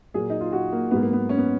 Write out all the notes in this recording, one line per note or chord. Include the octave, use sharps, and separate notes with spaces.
A#2 F#3 A#3 G#4
D#4
F4
F#4
A#3
G#2 F#3 A#3 B3
A#3
B3
C#4
B3